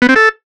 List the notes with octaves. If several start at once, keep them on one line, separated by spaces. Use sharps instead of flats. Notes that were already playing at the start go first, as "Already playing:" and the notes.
B3
C4
A4